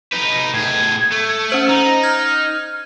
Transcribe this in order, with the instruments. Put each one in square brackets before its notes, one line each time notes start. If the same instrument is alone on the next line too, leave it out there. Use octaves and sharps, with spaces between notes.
[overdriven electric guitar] D#4 B4
[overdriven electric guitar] A2 G#4 [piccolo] G#6
[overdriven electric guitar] A3
[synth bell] C#4 C5 F#7
[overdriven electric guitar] D#4 [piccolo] A#5
[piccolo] F6 [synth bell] G#6